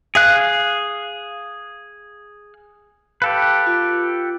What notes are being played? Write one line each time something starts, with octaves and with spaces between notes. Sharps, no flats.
G#4 F5 F#6
G4 A4 B4 F5
F4